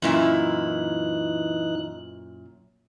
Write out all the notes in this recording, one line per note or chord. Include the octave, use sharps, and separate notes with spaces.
F#2 A#2 E3 D#4 E4 F#6